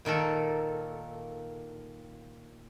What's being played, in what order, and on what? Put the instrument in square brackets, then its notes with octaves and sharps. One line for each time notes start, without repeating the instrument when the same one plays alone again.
[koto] A#2 D#3 A#3 A4